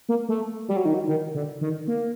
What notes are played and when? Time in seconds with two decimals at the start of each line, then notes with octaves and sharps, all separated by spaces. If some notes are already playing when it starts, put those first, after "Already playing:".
0.09 A#3
0.29 A3
0.68 G3
0.76 F#3
0.85 D#3
0.94 F#3
1.08 D#3
1.35 D3
1.61 D#3
1.88 A#3